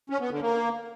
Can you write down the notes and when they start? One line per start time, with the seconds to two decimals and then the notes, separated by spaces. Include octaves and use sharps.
0.10 C#4
0.20 B3
0.31 D3
0.41 A#3